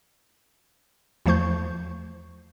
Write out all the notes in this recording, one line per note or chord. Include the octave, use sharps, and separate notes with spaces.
E2 F3 A3 C5 C#6 G6